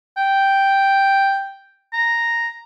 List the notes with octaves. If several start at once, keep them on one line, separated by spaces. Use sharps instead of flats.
G5
A#5